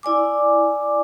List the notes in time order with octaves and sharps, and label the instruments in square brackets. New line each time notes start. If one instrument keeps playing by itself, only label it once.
[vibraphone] E4 D5 G#5 D6